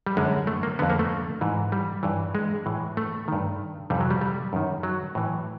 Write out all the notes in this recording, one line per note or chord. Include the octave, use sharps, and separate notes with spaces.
G3
F#2 D3 G#3
A3
A#3
F2 D3 B3
A#3
A3
G#2 E3
G3
G2 E3
G#3
A2 E3
A3
G2 D#3
F2 C3 E3 G3
F#3
G3
G3
F#2 D#3
F#3
A2 E3